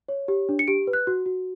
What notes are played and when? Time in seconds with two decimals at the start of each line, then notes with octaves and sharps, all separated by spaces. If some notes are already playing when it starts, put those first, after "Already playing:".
0.08 C#5
0.28 G4
0.49 D4
0.59 C#7
0.68 G4 D7
0.87 B4
0.93 F#6
1.07 F#4
1.26 F#4